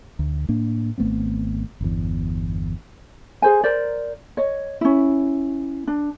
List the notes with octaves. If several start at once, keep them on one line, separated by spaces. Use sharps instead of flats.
D2
A2 A#3 D4
G#1 A3 B3 C4
G1 E2
G#4 C5 G#5
A#4 C5 D5
C#5 D#5
C#4 E4
D4